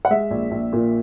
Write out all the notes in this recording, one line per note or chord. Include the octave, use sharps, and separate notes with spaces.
F#5
G#3 E5
A#1
A#1
A#2